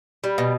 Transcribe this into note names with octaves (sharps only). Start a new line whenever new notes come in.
G3
B2